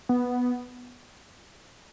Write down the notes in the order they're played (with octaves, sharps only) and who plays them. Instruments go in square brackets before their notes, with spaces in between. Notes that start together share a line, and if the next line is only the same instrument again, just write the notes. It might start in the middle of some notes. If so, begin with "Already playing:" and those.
[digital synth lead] B3